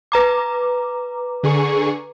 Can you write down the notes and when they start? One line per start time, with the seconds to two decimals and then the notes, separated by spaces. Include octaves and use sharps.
0.12 B4 A#5 D6
1.43 D3 G#4 C#6